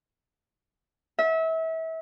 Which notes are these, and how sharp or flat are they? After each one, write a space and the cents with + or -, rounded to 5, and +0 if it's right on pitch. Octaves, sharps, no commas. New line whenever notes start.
E5 -30